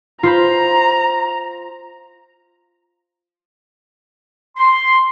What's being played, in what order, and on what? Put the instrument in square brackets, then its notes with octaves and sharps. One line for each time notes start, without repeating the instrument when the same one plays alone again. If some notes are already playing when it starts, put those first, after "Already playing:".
[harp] F4 C5 B5 [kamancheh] A#5
[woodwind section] C6